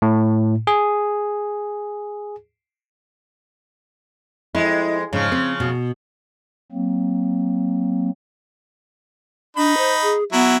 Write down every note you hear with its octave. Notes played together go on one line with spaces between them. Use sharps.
A2
G#4
F2 G#3 E4
G#2 C#3 F3
C4
B2
F#3 A#3 C4
D4 D#4 B5
C5
G#4
F#3 B3 E4